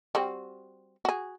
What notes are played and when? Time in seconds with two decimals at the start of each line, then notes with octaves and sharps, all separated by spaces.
0.15 G3 C4 F#4
1.05 F#4 G#4